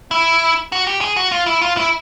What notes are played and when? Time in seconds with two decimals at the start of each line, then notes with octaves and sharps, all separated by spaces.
0.11 E4
0.72 F#4
0.87 G4
1.01 G#4
1.17 F#4
1.32 F4
1.46 E4
1.62 F4
1.77 E4